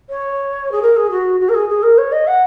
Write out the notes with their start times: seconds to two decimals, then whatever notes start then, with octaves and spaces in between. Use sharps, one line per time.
0.09 C#5
0.71 G#4
0.82 A#4
0.96 G#4
1.10 F#4
1.40 F#4
1.49 A#4
1.54 G#4
1.69 G#4
1.83 A#4
1.98 C#5
2.12 D#5
2.27 F#5